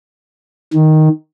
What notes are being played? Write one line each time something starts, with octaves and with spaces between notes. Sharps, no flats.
D#3